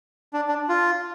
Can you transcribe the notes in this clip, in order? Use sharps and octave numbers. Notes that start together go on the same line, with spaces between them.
D4
D4
F4